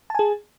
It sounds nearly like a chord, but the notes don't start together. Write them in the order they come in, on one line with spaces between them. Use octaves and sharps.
A5 G#5 G#4